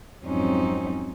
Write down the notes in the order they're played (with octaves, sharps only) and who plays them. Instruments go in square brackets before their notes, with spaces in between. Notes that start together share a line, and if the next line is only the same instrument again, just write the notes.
[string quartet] F2 G#2 F#3 C4 C#4 D#4